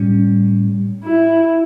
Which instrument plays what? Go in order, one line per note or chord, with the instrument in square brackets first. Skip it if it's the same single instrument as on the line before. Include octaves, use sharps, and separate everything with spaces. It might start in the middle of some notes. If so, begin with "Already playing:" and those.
Already playing: [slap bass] A2 G3 C#4
[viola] E4